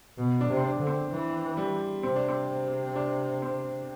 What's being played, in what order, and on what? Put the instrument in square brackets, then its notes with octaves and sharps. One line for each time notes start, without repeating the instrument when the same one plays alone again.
[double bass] B2
[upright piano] D4
[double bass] C3
[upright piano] C4
D4
[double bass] D3
[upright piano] C4
[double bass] E3
[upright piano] G3
[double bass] C3 [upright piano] C4
[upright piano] D4
C4
D4
C4